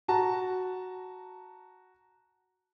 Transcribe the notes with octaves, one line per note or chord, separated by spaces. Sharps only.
F#4 A5 A#5